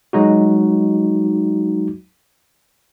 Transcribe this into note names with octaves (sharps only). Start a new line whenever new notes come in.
F#3 G#3 D#4 F#4